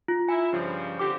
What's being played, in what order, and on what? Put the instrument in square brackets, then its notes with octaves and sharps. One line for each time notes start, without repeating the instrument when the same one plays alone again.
[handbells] F4
[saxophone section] E4 [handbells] G#5
[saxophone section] G2 C#3 F3
[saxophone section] D3 C4 G4 [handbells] D6